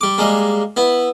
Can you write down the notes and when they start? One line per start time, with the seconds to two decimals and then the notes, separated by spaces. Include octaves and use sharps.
0.01 G3 D6
0.18 G3 G#3 A#3
0.77 B3 E4